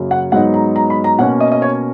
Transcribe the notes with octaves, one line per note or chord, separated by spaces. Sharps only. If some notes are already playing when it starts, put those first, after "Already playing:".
Already playing: F#2 C#3 F#3 A#3
F#5
G#2 F#3 B3 D#4 F#5
A#5
A#5
B5
A#5
B2 A#3 C#4 F#5
D#5
D#5
C#5